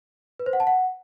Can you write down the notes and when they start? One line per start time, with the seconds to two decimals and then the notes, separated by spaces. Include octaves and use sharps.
0.40 B4
0.46 C5
0.53 F#5
0.60 A5
0.67 F#5